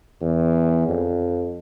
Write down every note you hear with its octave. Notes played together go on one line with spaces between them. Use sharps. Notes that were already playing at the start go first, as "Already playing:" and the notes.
E2
F2